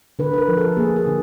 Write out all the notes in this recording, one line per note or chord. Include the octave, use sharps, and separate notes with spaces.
D3 B4
B4
A#4
F3
A4
A#3 G#4
G#4
D3